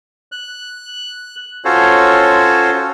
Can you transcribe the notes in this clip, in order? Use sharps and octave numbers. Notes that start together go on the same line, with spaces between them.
F#6
C#4 F4 F#4 A4 C5 C#5